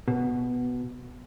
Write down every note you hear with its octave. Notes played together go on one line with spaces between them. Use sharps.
B2